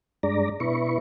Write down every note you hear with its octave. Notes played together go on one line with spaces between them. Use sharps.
G2 G#3 D4 D5 A#5
B2 E4 B4 C#6